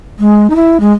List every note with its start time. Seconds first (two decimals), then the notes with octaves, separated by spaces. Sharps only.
0.19 G#3
0.50 D#4
0.55 E4
0.80 G#3